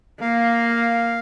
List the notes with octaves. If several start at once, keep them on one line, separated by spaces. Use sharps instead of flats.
A#3 F5